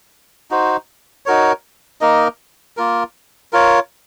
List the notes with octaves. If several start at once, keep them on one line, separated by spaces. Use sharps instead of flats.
D#4 F#4 C5
D#4 F#4 A#4 C#5
A#3 D#4 A#4 D#5
A#3 F4 A#4
F4 A#4 C#5